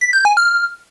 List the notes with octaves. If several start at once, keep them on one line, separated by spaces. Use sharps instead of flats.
B6
G6
G#5
F6